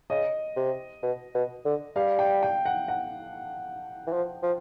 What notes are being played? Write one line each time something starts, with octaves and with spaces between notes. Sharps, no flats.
C#3 D#5
C3
B2
B2
D3
G3 F5
G5
G5
F#5
F#5
E3
F3
F3